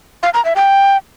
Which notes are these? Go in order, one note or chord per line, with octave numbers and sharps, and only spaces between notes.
F5
A#5
E5
G5